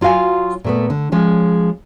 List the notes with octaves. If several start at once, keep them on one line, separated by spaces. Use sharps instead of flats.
F#3 F4 F#4 F5 G#5
A#2 A3 B3
D3
F3 G#3 C#4